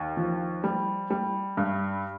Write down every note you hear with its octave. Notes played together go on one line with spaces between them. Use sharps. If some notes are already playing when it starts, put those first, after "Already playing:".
Already playing: D#2
F3
G3
G3
G2